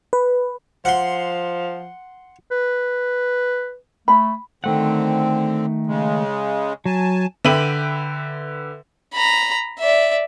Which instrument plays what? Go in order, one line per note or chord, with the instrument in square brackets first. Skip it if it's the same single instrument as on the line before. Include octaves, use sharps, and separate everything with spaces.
[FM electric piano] B4
[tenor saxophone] F3 [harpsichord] F#5 C6
[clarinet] B4
[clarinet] A3 [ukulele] B5
[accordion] D3 C4 [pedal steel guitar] D#3 A3 F#5
[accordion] C#3 G#3
[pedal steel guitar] F#3 [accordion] G#5 A5
[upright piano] D3 B4 E5 G5 D#7 F#7
[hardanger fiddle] A#5 B5
D5 E5